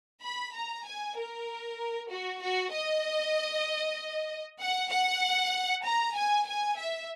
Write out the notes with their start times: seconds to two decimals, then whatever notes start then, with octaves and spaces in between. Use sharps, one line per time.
0.23 B5
0.55 A#5
0.86 G#5
1.17 A#4
2.10 F#4
2.42 F#4
2.73 D#5
4.60 F#5
4.90 F#5
5.85 A#5
6.16 G#5
6.47 G#5
6.78 E5